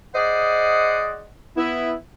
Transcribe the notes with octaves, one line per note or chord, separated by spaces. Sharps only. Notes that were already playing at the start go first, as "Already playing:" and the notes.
G#4 C5 D5 D#5 F#5
B3 E4